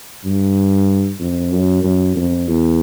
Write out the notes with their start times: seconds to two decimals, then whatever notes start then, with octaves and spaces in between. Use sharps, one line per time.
0.24 G2
1.20 F2
1.52 F#2
1.84 F#2
2.15 F2
2.47 E2